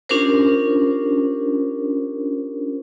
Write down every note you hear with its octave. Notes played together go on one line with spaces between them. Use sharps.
C#4 D4 F4 G4 A#4 C5